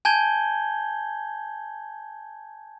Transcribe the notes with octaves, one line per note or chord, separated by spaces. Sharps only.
G#5 A5 G6 G#6 G7